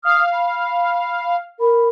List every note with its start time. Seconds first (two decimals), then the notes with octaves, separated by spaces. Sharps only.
0.05 F5 D#6 F6
0.33 B5
1.59 A#4 B5